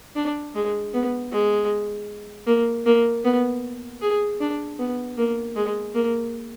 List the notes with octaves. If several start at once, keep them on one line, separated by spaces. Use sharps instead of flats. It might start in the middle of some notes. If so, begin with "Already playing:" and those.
D4
G#3
B3
G#3
A#3
A#3
B3
G#4
D4
B3
A#3
G#3
A#3